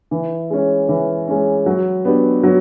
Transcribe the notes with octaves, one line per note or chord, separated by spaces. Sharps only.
E3
G#3 C#4
E3
G#3 C#4
F#3
B3 D4 G4
F#3